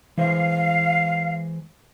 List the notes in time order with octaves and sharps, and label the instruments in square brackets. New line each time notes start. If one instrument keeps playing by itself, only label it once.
[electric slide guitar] E3 G#3 C5 [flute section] F5